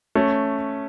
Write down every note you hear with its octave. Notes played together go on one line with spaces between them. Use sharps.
A3 C#4